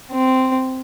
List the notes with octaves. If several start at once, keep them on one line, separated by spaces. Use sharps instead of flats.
C4